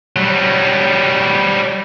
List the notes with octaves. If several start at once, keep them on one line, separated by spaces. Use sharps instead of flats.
F#3 G3